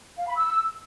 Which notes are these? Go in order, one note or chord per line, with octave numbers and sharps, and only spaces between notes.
F5
B5
E6